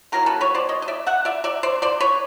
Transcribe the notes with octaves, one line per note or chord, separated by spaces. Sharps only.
D#3 F#3 B3 E4 A#4
A4 B4
B4 C#5
C5 D5
C#5 D#5
D#5
D5 E5
E5 F#5
D5 E5
D5 E5
C5 D5
C5 D5
B4 C#5